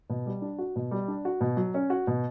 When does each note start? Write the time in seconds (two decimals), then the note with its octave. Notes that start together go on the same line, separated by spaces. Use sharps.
0.10 B2
0.26 G3
0.42 D4
0.58 F#4
0.76 B2
0.91 G3
1.08 D4
1.25 F#4
1.41 B2
1.57 F#3
1.74 C#4
1.90 F#4
2.07 B2